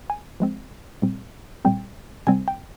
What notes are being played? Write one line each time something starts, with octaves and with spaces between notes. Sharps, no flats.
G#5
F3 G#3 C4
A#2 G3 C4
A#2 G3 C4 G5
C3 G3 C4 G#5
G5